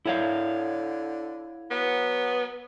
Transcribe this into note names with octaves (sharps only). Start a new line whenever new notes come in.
D3 E4 C#5 F5
F#3 B3